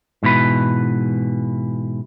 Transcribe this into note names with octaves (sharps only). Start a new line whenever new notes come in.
G#2 B2 E3 B4